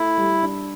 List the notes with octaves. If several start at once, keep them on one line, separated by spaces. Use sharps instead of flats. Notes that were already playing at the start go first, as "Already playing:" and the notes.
Already playing: A3 E4
G3
D4